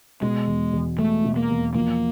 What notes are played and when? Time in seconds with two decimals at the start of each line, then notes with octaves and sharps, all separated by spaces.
0.22 B2 G#3
0.47 E2
0.73 E2
0.98 G#3 A3
1.24 B2
1.36 A#3
1.50 E2
1.75 F3 A#3